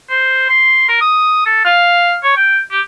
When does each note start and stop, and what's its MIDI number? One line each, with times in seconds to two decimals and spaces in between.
0.10 0.46 72
0.49 0.85 84
0.89 0.97 70
1.01 1.44 87
1.46 1.63 69
1.65 2.16 77
2.24 2.32 73
2.37 2.59 79
2.71 2.81 67